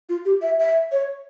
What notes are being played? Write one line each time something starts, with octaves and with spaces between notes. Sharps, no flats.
F4
G4
E5
E5
C#5